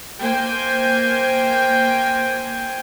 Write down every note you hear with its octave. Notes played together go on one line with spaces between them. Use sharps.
A#3 C5 G5 G#5